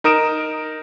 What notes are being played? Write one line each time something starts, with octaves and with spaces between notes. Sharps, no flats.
D#4 A#4 D#6 D7 E7